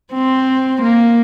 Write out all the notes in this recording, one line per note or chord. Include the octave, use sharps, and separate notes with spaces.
C4
A#3